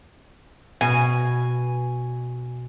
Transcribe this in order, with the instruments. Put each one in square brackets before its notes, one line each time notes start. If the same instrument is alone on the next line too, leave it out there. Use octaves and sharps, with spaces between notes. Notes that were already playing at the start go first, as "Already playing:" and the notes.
[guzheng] B2 [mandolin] G#5